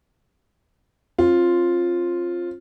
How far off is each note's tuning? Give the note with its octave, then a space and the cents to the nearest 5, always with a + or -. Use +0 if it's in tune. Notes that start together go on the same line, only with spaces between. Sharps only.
C4 +35 F4 +0